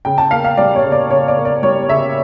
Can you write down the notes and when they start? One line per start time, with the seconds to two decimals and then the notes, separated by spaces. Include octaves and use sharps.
0.05 C#3 G5
0.18 A5
0.31 A#3 F5
0.44 F5
0.57 G3 D5
0.76 C#5
0.84 C#3
0.92 D5
1.10 C#3 C#5
1.28 D5
1.37 A#3
1.45 D5
1.63 G3 C#5
1.89 C#3 E5